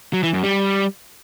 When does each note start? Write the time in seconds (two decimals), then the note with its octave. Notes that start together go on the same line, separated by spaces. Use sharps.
0.13 F#3
0.23 E3
0.33 F#2
0.44 G3